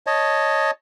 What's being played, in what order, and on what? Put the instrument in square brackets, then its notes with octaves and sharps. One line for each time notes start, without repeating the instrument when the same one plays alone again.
[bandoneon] C#5 D#5 A5